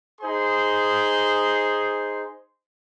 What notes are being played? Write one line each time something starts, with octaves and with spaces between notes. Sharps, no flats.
D#4 G#4 C5 C6